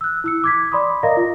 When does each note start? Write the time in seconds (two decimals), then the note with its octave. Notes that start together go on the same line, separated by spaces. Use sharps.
0.01 E6 F#6
0.24 E4 E6 C#7
0.44 D6 G#6 B6
0.72 D5 B5 C6 D6 D#6
1.03 A#4 D5 D#5 F5 A#5 A#6
1.17 F4